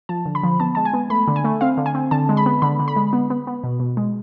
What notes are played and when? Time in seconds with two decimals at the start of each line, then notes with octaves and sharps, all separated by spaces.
0.09 F3 A5
0.26 D3
0.35 B5
0.44 F3
0.60 B3 A5
0.75 G#3 A5
0.85 G#5
0.93 B3
1.10 A3 B5
1.28 D3
1.36 G#5
1.44 A3
1.61 C4 F5
1.77 D3
1.86 G#5
1.95 C4
2.11 D3 A5
2.29 G#3
2.37 B5
2.46 B3
2.62 D3 B5
2.79 D3
2.88 B5
2.96 G#3
3.13 B3
3.30 B3
3.47 B3
3.64 B2
3.80 B2
3.97 G#3